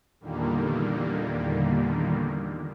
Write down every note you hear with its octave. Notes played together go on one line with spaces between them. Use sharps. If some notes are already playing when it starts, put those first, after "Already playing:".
E2 A#2 D3 D#3 G3 A#3